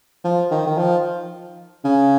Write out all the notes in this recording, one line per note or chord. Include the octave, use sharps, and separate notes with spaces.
F3
D#3
D#3
F3
C#3